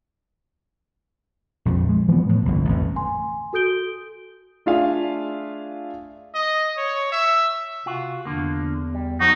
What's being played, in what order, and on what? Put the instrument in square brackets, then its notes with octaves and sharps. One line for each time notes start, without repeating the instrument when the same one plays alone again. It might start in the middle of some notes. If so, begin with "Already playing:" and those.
[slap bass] A#1 F2 F3
G#3
E3 F3 A#3 B3
A2
G1 C2
A1 F2
[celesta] G#5 C6
F#4 A4 D#6 G6 D7 G7
[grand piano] A3 D4 F4 G#4 E5 F5
[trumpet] D#5
C#5
E5
[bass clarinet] C3 [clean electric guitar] F4 F#4
[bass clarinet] E2 [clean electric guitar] D3 F3 A#3
[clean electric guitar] G3
[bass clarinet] F3 [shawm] D#4 [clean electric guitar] F#4